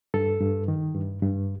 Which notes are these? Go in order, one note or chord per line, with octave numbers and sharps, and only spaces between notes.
G2 A4
G2
D#3
G2
G2